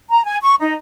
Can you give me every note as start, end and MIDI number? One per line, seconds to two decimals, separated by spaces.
0.10 0.24 82
0.24 0.36 80
0.42 0.53 85
0.60 0.73 63